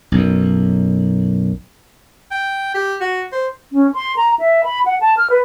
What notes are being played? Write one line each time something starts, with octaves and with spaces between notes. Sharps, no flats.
B1 F#2
G5
G4
F#4
C5
C#4
C6
A#5
E5
B5
F#5
A5
F6
B4